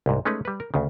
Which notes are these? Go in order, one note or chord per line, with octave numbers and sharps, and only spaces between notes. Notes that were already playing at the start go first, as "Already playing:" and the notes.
C2 G#2
G#3 A3 C#4 D#4 B4
G3 B4
A#4
D2 C#3